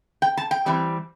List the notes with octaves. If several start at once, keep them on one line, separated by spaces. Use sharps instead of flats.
G5
A5
G5
E3 G3 C4